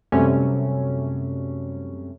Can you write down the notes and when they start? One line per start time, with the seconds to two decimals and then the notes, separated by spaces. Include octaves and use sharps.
0.12 F#2 C3 F#3 G3 A3 C#4